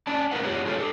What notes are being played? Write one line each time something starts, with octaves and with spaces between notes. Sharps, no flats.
C#4 D5 A5
D#4 A#4 B4 F5 F#5
B3 F4 G4 C#5 F#5
F4 G4 A4 C#5 D5 F5
G4 A4